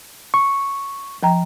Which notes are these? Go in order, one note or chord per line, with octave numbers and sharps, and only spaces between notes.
C#6
F3 G5 A#5